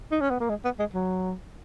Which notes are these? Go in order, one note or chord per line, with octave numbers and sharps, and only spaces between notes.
D#4
C#4
B3
A#3
G#3
B3
G#3
F#3